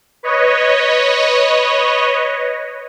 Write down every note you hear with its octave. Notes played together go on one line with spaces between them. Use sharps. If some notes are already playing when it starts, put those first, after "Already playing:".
B4 C#5 D#5